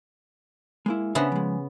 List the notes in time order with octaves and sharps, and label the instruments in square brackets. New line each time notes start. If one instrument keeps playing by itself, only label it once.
[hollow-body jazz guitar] G#3 A#3 E4
[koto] C#3 B3 [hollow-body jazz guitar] D4 C5 E5
[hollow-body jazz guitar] F3 G#3